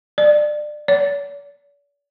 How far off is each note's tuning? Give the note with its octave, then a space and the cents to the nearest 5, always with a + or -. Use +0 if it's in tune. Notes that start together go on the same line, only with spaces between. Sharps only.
D5 +25
D5 -45